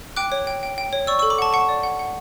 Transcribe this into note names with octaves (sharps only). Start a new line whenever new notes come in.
G5 D6 F#6
C#5
G5
G5
G5
C#5
D5 C#6 E6
C#6 E6
A4
B5 D6
F#5 A5 C#6
F#5 A5 C#6
D5
F#5
F#5